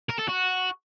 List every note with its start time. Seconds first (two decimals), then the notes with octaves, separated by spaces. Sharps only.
0.10 A#4
0.19 A4
0.29 F#4